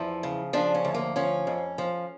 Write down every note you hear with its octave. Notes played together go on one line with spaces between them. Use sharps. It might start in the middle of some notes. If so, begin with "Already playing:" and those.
Already playing: E2 F3 E4
C#3
F3 D4
C#4
D2
A#3
F3 C#4
F2
F3